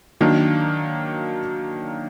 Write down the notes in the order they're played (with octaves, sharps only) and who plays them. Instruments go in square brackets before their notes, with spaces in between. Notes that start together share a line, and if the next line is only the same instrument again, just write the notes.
[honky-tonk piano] D#3 F#3 A#3 D4